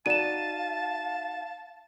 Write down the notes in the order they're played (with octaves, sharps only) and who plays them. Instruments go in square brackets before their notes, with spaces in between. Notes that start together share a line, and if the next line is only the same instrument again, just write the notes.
[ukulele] D#4 F#4 D5 [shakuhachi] F5 [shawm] A5 [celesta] D#7 E7